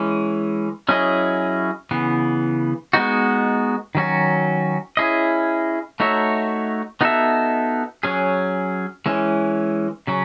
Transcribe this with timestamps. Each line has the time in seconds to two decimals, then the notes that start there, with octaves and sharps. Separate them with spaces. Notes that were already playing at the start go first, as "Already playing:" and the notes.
Already playing: E3 G#3 C#4
0.89 F#3 C#4 E4 G#4 D#5
1.91 C#3 E3 B3
2.93 G#3 B3 D#4 F#4
3.95 D#3 F#3 C#4 F#4
4.97 C#4 E4 G#4 D#5
6.00 A3 D#4 F#4 C#5 E5
7.01 B3 D#4 F#4 A4 E5
8.03 F#3 C#4 G#4
9.06 E3 G#3 C#4
10.07 C#3 F#3 C#4